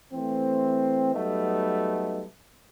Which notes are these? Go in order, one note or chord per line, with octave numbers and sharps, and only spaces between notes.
E3 A3 C4
F#3 G3 A3 B3 D#4